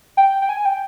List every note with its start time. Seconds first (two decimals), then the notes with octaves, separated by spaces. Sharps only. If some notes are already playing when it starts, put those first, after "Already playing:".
0.17 G5
0.42 G5
0.49 G#5
0.65 G5